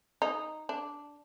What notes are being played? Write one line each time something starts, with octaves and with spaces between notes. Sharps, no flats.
D#4
D4